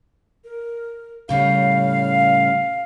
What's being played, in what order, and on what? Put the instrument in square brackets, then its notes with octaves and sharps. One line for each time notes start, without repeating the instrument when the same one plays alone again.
[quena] A#4
[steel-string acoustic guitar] A2 C#3 G3 [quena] F5